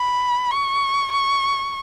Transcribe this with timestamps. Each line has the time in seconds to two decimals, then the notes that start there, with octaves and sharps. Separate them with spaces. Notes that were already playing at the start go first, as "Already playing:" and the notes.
Already playing: B5
0.51 C#6
1.12 C#6